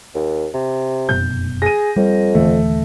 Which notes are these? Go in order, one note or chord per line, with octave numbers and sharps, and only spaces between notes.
D#2
C3
F1 F#2 B2 G6
G#4 A#6 D#7
F2 G3
D#1 D3 E3 A3